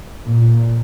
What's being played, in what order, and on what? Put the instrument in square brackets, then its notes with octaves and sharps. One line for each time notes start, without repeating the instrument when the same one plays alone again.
[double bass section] A#2